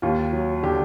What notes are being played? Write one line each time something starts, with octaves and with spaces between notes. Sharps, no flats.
D#2 F4
F#3
D3 G4